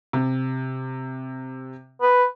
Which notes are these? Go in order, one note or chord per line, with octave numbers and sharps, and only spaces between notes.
C3
B4